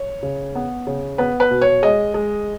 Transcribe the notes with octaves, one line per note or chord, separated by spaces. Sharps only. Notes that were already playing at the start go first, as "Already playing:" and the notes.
Already playing: C#5
C#3
B3
C#3
B3 B4
B4
B2
C#5
G#3 D#5
G#3